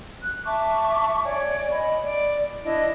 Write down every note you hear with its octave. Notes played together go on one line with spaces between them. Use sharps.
F#6
E5 A5 C#6 D6
C#5 D5 G#5
D#5 B5
D5
D4 E4 D#5